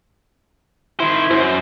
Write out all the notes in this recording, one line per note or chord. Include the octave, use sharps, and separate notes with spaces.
D#3 E4 C5
F#2 C5